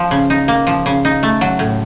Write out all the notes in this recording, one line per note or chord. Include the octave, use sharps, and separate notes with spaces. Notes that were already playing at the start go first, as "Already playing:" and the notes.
Already playing: F3
C#3
D#4
A#3
F3
C#3
D#4
A3
F#3
A2